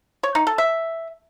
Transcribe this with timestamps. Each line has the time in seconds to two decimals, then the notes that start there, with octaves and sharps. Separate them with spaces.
0.23 C#5
0.35 D#4
0.47 A4
0.58 E5